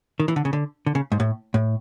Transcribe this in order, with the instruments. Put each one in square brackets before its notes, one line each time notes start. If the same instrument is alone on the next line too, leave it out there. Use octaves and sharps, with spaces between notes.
[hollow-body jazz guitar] D#3
E3
D3
C#3
D3
D3
C#3
G#2
A2
A2